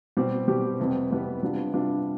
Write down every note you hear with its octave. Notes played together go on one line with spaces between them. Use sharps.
B2 G3 C4 G4
B2 G3 C4 G4
F2 C3 G3 B3
F2 C3 G3 B3
C3 G3 B3 D4 F4
C3 G3 B3 D4 F4